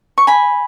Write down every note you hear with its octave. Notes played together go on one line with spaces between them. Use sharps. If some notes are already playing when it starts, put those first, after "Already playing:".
C#6
G#5 B5